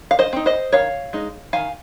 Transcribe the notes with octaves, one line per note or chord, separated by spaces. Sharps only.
F5
C5 D#5
C4 D#4
C5 D#5
D#3 C#5 F5
G#3 D#4
D#3 F5 G#5